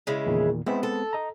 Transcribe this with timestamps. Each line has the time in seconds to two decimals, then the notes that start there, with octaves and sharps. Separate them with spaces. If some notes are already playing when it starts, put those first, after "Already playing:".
0.07 C#3 G#3 E4
0.26 E2 A#2 D#3
0.66 G#3 B3 C4 E4
0.83 A4
1.13 D#5 A#5